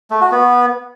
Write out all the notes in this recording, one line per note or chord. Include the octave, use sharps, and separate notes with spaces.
A3
F#4
B3